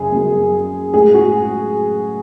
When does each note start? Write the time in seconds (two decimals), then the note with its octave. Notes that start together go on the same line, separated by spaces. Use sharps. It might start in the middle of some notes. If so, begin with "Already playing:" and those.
Already playing: F#2 C#3 G#4
0.12 F#2 C#3 F#3
0.93 A2 G#3 G#4
1.14 F#4